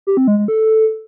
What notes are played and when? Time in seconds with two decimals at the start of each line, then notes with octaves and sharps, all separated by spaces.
0.07 G4
0.17 C4
0.27 G#3
0.38 G#3
0.48 A4